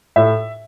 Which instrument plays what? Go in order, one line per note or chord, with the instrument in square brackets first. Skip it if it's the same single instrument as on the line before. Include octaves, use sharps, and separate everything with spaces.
[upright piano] A2 E5